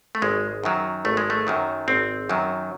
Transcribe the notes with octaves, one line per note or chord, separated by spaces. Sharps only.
A3
G#1 G#3
F#2 D#3 F#3
G#1 A3
G#3
A3
F#2 D#3 F#3
G#1 C4
F#2 D#3 F#3